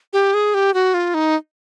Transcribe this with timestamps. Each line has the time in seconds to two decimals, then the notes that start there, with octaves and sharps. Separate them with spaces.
0.13 G4
0.34 G#4
0.54 G4
0.74 F#4
0.94 F4
1.14 D#4